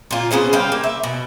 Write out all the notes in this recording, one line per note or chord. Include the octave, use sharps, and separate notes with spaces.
A#2 F4
B3 C#4 G#4 C5
G3 C5 F5 G5
A#3
E5
B2